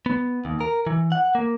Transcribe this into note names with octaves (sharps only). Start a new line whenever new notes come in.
B3
D#2
A#4
E3
F#5
A#3